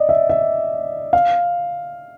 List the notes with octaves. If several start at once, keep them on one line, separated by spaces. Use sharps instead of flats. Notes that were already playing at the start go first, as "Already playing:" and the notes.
Already playing: D5 D#5
E5
E5
F5